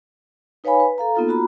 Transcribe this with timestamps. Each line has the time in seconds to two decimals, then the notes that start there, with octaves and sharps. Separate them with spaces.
0.64 D#4 B4 C#5 F5 G#5 B5
0.80 B4
0.98 A4 F5 A#5
1.15 A#3 B3 D#4 F4 A4
1.28 F4 F#4 A#5 B5